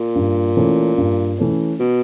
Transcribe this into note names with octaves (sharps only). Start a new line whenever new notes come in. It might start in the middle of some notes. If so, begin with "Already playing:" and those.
Already playing: A#2
G2
E3 A3 C#4
G2
E3 A3 C#4
B2